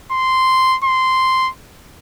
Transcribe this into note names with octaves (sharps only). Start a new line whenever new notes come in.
C6
C6